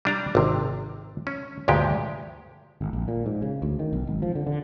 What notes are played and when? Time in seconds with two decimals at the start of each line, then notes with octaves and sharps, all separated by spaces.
0.05 G3 D4 A#5
0.35 G#1 C3
1.27 C#4
1.68 D2 G2 A#2 G#3 G4
2.81 G#1
2.93 A#1
3.08 A#2
3.26 G#2
3.42 C#3
3.62 D2
3.79 D#3
3.93 B1
4.07 G#1
4.22 F3
4.35 D3
4.47 D3